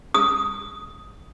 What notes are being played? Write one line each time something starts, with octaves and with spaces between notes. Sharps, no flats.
D#6